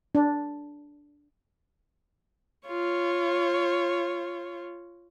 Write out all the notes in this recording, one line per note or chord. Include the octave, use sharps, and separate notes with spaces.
D4
F4 C#5